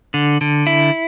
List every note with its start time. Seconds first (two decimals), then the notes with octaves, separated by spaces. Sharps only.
0.14 D3
0.41 D3
0.67 E4